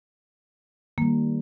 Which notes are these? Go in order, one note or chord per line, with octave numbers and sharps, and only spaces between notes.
D#3 G3 A#3